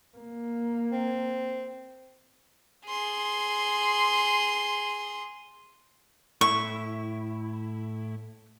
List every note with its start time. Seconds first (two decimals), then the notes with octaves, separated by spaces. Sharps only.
0.18 A#3
0.92 C4
2.87 G#4 C6
6.41 A2 E4 C#6